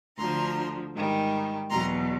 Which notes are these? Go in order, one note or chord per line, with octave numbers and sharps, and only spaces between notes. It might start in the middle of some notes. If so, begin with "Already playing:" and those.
D2 D3 F3 A#5 C6
G#2 D#3 G3
E2 B2 F#3 A#5 C6